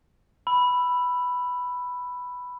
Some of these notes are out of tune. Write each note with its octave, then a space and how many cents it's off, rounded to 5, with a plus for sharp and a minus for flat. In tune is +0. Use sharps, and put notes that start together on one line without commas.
B5 +0 E6 +15